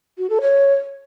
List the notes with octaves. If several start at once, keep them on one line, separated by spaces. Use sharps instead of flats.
F#4
A4
C#5